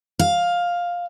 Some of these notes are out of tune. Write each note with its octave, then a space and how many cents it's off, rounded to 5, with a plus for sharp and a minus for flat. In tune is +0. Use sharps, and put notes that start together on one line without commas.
F5 +10